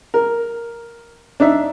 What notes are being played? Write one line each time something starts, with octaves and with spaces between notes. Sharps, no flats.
A#4
D4 D#4 E5